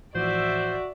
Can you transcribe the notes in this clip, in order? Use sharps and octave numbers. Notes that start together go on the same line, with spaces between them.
A2 E3 F3 F#4 C5 D5 E5